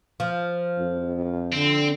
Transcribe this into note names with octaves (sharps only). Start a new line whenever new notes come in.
F3
F2
D3 C4